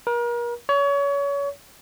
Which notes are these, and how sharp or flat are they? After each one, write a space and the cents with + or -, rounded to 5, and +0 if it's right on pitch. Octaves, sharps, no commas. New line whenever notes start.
A#4 +35
C#5 +30